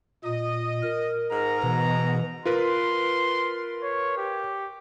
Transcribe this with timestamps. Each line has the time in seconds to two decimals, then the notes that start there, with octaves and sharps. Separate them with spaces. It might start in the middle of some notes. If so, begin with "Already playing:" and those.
0.25 A#2 D#5
0.83 A#4
1.31 G#2 A#5
1.63 B2 E3
2.45 F4 A#4 B4 C6
3.83 C#5
4.18 G4